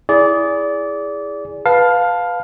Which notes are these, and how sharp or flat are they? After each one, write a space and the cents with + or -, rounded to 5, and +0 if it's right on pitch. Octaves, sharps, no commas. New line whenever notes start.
E4 +0 G#4 +0 D5 -25
B4 -5 F5 +15 A5 +0